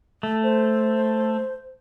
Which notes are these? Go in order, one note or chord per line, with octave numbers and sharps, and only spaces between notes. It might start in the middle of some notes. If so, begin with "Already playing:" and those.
A3
C5